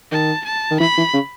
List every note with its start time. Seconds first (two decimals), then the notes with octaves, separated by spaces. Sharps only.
0.11 D#3 A5
0.45 A5
0.71 D#3
0.80 E3 B5
0.98 E3
1.14 C#3